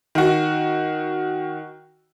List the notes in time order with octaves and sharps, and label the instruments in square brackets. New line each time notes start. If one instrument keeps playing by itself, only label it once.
[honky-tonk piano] D#3 F#4